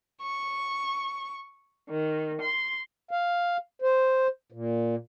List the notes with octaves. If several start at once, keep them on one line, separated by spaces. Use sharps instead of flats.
C#6
D#3
C6
F5
C5
A#2